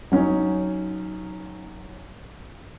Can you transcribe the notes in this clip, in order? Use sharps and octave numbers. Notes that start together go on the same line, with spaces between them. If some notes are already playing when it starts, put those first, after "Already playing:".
F#3 C#4 D#4